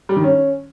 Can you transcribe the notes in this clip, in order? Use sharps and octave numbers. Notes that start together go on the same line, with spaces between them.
G3
D#3
C#4